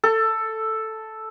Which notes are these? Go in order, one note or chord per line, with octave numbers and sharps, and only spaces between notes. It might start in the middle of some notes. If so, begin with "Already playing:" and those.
A4